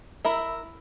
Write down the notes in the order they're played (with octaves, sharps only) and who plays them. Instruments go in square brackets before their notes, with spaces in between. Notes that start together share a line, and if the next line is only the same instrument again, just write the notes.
[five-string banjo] E4 A#4 E5